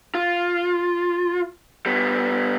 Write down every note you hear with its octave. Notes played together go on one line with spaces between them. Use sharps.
F4
G3 B3